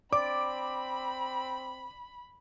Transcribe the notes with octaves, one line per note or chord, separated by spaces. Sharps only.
C4 D5 B5 D6